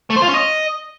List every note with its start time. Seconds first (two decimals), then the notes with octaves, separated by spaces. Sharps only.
0.10 A3
0.16 C5
0.22 F4
0.28 C#4
0.34 D#5